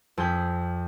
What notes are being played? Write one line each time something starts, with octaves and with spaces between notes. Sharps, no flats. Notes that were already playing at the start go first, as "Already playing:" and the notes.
F2 G#4 G6 B6